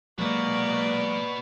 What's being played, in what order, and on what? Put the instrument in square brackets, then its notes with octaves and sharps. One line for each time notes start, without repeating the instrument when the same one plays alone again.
[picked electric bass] F#3 G#3 [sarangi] A#3 [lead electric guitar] B3 F#4 [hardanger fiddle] D5